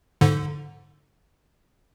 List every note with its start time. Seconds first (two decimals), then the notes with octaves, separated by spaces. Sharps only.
0.21 G#2 D3